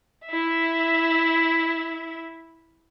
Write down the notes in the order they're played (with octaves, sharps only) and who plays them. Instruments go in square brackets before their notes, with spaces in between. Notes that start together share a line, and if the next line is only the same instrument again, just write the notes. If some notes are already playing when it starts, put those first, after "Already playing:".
[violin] E4 E5